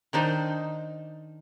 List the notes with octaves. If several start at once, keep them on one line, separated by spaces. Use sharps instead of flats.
D#3 D4 D#4 C5